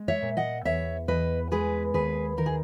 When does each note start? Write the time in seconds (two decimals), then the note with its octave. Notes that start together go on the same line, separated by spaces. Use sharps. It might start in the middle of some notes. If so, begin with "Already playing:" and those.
Already playing: G#3
0.08 C#5 E5
0.22 A#2
0.37 D#5 F#5
0.65 E2 C#5 E5
1.08 E2 B4 D#5
1.51 G#3 G#4 B4
1.94 D#2 G#4 B4
2.37 D#3 A#4
2.46 G#4